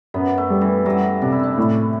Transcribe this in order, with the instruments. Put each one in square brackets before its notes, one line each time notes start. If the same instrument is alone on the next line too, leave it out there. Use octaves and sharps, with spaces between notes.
[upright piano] F#2 [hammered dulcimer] B3
[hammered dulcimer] A3
[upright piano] G3
[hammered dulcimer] E3
[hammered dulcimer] F#3 [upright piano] G3
[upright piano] C3 [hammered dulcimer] D4
[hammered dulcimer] E4
D4
[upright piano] A2